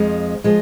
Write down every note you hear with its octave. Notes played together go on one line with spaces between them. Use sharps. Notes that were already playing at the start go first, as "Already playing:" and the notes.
Already playing: F2 F3 G#3
F3 G#3